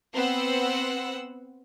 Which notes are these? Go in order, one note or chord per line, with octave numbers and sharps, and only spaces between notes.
B3 C4 C5 F#5 E6